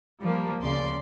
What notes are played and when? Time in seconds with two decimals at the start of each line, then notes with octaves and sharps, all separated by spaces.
0.23 F3 G3 A#3
0.61 D2 C#3 D5 C6